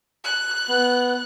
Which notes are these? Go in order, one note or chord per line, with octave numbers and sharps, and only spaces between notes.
F#6
B3